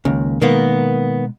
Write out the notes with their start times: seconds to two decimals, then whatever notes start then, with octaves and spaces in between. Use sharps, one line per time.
0.05 C#2 D#3 A#3 C#4
0.42 B2 D#3 G#3 A#3 B3